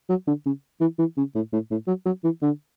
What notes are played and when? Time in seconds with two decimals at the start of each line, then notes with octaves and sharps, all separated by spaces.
0.09 F#3
0.27 D3
0.46 C#3
0.81 E3
0.99 E3
1.17 C#3
1.35 A2
1.53 A2
1.71 A2
1.88 F#3
2.06 F#3
2.24 E3
2.42 D3